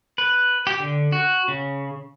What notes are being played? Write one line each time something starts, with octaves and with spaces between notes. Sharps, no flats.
B4
G4
D3
F#4
C#3